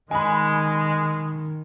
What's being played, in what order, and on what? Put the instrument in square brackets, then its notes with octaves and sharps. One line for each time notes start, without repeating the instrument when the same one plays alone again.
[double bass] D#3 [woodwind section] G#3 [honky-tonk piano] G#5 B5